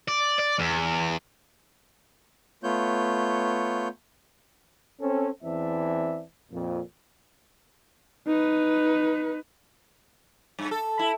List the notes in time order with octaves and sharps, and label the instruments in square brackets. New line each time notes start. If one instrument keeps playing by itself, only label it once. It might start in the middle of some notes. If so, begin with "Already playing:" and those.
[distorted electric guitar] D5
D5
E2
[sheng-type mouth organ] A3 B3 F4 C#5 G6
[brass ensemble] C4 C#4 A4
E2 E3 C4 D5 E5 A5
F2 A#2
[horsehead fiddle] D#4 B4
[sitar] G2
A4
E4